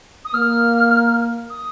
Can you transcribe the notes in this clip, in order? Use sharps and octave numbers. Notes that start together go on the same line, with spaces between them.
D#6
A#3 F6
D#6